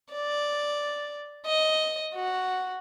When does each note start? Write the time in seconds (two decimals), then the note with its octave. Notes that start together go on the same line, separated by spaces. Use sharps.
0.13 D5
1.46 D#5
2.15 F#4